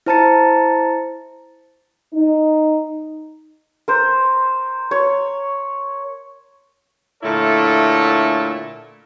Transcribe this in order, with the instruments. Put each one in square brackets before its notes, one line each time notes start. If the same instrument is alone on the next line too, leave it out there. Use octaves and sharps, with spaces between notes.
[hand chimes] E4 C5 A5 A#5 A6 C#7
[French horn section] D#4
[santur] A#4 C5
C#5
[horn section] A#2 D3 A3 E4 A4 C#5